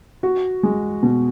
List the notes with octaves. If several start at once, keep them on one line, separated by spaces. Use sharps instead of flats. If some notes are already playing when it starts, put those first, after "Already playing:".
F#4
G#3
B2